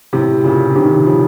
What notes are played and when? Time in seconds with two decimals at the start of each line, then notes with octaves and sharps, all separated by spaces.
0.13 A2 C3
0.44 A#2 C#3
0.76 C3 D#3
1.06 C#3 F3